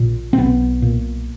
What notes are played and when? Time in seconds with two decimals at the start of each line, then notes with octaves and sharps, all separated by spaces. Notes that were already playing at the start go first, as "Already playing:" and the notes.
Already playing: A#1 A#2
0.33 C4
0.38 B1 B3
0.82 A#2